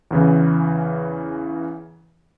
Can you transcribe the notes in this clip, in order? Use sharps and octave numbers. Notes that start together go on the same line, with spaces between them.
E2 C#3 E3